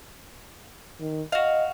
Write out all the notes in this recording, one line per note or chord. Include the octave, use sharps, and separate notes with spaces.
D#3
F#4 D#5 F5